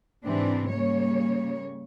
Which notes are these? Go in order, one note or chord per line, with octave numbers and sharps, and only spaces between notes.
G#2 C3 E3 C4 D4
C#3 G3 A#3 C#5